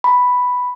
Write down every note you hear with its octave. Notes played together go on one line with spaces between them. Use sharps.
B5